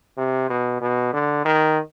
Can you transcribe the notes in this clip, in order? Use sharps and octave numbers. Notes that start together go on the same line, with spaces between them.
C3
B2
B2
D3
D#3